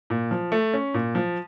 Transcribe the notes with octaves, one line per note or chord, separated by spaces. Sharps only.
A#2
F3
A3
C#4
A#2
F3